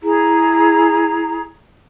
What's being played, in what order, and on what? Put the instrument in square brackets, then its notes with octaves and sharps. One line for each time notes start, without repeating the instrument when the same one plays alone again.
[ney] E4 [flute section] G#4 A#5